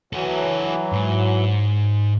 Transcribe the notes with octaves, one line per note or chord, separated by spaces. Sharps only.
E3 F#3 F#4 A4
G#2